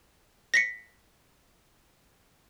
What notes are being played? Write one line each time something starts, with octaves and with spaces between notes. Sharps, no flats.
A#6 B6 C#7